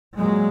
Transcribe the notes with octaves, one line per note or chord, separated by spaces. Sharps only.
A#2 F#3 G#3